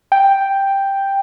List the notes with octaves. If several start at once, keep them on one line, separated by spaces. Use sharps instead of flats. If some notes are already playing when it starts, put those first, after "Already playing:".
G5